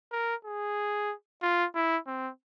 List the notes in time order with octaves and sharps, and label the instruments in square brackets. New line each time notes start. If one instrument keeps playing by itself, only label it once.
[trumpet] A#4
G#4
F4
E4
C4